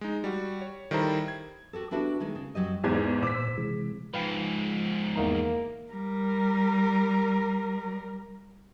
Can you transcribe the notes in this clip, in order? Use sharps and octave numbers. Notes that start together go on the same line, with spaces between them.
G#3 D#4
G3 F#4
C#5
D#3 G3 E4 A4 C5 A#5
G#6
F#4 G4 A4
B3 D4 E4 F#4 G4
D#3 G#3 D#4
C#3
F#2 F#3 G4 D#5
E2 G#2 G#6
A#2 C5 D6 E6 B6
C3 E3 G#3
G#2 F3 B4 F5 G5
E2 D#3 A#3 A#5
G3 A#4